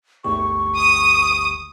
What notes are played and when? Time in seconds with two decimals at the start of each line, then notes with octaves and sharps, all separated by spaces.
0.24 G1 D2 G4 C#6
0.77 D#6